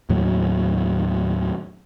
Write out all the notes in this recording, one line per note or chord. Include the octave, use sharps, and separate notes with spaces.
D#2 A2 F#3